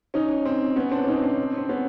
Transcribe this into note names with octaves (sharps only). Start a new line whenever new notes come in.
C#4 D#4
C4
B3 C#4
C4 D4
C#4 D#4
C4 D4
C4
B3 C#4